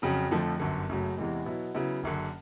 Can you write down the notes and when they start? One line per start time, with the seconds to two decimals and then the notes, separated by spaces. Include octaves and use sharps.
0.02 F2 C#3 F#3
0.31 F2 D3 F3 A3
0.60 G1 F#2 D3
0.89 F#1 F#2 C#3 F#3 A3
1.17 E2 C3 E3 G#3
1.45 B2 F#3 B3 E4
1.75 C#3 F#3 B3 E4
2.03 F#1 F#2 D3